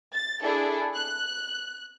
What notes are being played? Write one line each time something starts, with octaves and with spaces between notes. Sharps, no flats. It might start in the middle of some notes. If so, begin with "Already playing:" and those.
A6
D4 E4 G#4 A4
F#6